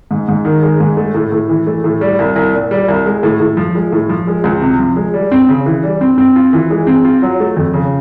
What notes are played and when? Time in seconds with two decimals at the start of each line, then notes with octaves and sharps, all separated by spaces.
0.11 G#2
0.28 G#2
0.45 D#3
0.62 G#3
0.80 G#2
0.97 A3
1.14 A2
1.32 A2
1.49 E3
1.67 A3
1.84 A2
2.01 G3
2.19 C2
2.36 C2
2.54 A#2
2.71 G3
2.89 C2
3.06 G#3
3.23 A2
3.40 A2
3.57 F3
3.75 G#3
3.92 A2
4.09 F3
4.27 G#3
4.44 C#2
4.61 C3
4.79 F3
4.96 G#3
5.14 G3
5.32 C4
5.49 C#3
5.66 E3
5.83 G3
6.01 C4
6.18 C4
6.36 F4
6.53 E3
6.70 G#3
6.87 C4
7.05 F4
7.22 F#3
7.40 A3
7.57 F2
7.74 C#3